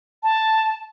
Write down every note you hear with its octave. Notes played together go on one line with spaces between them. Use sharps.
A5